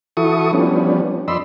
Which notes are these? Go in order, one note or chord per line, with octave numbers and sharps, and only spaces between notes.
E3 E4 F#4 A4 C#6 D#6
F3 G3 B3 C#4 D4
F2 D5 D#5 B5 C6 E6